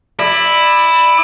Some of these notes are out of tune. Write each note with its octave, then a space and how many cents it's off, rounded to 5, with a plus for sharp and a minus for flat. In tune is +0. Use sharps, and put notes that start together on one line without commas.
E4 +0 D5 +30